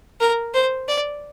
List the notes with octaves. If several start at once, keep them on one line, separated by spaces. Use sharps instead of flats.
A#4
C5
D5